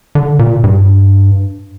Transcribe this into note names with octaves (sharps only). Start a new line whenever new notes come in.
D3
A#2
G2